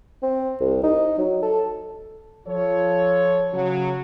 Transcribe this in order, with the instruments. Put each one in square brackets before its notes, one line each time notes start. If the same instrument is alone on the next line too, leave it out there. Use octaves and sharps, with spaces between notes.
[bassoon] C4
C2
D#4
F#3
A4
[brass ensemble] F3 F4 A4 C#5
C#3 F#3